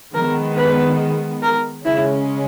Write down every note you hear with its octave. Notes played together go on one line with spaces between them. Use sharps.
D#3 G#3 B3 A#4
B4
A#4
C#3 G#3 C#4 E4